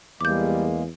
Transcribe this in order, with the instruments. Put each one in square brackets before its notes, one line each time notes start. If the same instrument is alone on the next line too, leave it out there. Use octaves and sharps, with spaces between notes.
[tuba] E2 [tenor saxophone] G3 [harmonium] G#3 A#3 [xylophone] D6 G6